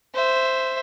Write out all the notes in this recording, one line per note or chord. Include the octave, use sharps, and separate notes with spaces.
C5 E5